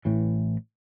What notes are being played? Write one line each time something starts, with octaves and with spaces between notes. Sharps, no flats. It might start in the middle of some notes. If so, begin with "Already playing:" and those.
A1 A2 E3